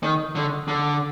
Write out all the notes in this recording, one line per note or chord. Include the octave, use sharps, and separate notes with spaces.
D#3
D3
D3